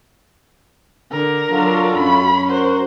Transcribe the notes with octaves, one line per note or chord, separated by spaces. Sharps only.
D3 A#4
F#3 D4 F4 F#4 A4
F#2 C#4 B5
F#4 A#4 C5 F#5